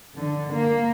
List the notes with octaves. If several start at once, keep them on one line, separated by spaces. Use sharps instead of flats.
D3
A#3